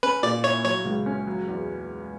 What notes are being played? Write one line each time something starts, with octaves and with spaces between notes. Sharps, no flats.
C#4 B4
A#2 D5
E4 C#5
F#3 C#5
C#2
C#4
F#3
E2